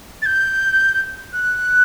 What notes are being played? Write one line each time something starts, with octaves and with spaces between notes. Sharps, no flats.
A6
G6
F#6